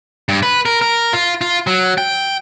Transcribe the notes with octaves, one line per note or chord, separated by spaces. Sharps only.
G2
B4
A#4
A#4
F4
F4
F#3
G5